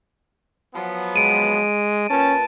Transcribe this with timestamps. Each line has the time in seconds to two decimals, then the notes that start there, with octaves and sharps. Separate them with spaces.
0.75 F3 F#3 B3
1.16 G#3 D7 D#7
2.10 A#2 C#4 B4 A5